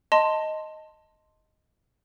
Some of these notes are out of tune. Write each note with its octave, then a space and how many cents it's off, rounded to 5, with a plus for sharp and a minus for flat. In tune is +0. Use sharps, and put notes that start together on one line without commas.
D#5 +5 A5 +15 C6 +5